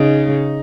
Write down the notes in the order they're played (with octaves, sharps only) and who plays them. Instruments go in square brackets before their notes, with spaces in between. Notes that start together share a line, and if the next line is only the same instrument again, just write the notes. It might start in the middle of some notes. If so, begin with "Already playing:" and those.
Already playing: [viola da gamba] C#3 [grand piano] D#4